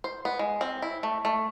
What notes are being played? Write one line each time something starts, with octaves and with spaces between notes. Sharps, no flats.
C5
B3
G#3
C4
E4
A3
A3